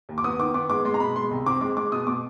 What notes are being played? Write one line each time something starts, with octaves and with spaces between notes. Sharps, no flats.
D#2
D6
B3 D#6
D#3 D6
B3 D6
G#3 D6
G#3 C6
A#5
B2 B5
G#3 C6
C2
C4 D6
G#3 D6
G#3 D6
B2 D#6
B2 D6